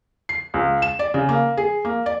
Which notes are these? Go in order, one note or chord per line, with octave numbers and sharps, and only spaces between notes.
C7
C#2
E7
D5
C#3
A#3
G#4
A#3
D5